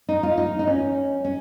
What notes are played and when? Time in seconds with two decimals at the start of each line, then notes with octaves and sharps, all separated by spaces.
0.09 D#4
0.23 F4
0.38 D#4
0.59 D#4
0.67 C#4
1.25 C#4